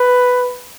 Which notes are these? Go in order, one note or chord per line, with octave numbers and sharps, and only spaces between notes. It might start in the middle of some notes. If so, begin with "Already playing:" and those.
Already playing: B4